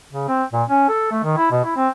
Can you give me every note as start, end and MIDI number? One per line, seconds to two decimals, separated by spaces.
0.13 0.28 49
0.28 0.43 60
0.53 0.63 46
0.69 0.87 61
0.89 1.09 69
1.11 1.23 57
1.24 1.36 51
1.37 1.49 64
1.51 1.60 47
1.65 1.74 64
1.77 1.88 60